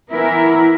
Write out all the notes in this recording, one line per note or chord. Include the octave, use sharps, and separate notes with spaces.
E3 B3 E4 A#4